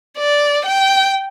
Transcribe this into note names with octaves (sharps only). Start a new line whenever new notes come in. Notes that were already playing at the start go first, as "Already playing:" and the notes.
D5
G5